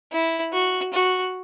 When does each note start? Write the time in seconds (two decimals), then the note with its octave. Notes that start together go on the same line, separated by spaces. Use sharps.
0.12 E4
0.53 F#4
0.93 F#4